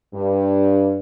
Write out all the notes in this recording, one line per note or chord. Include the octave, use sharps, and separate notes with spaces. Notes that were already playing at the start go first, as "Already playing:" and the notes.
G2